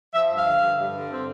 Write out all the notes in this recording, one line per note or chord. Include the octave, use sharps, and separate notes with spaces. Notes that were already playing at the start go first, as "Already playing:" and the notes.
F3 E5
G2
F5
D3
G2
G2
D3
C4